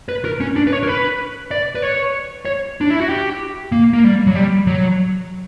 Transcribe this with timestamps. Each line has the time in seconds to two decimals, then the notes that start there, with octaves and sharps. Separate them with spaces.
0.09 B4
0.25 A#4
0.40 C#4
0.56 D4
0.67 B4
0.72 C#5
0.83 A#4
0.88 B4
1.51 D5
1.75 B4
1.82 C#5
2.45 C#5
2.81 D4
2.90 E4
3.00 F#4
3.09 G4
3.72 A#3
3.93 A#3
4.04 G3
4.27 F#3
4.35 G3
4.67 F#3